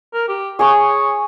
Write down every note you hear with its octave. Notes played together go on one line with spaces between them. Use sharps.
A#4
G4
G#4 C#5 C#6 D#6